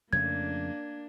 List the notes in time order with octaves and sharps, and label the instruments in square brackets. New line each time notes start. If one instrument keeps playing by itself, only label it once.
[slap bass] F2 C#3 A3 [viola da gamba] A#3 D4 [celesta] G#6